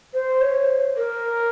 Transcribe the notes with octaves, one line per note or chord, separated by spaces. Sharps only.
C5
C#5
A#4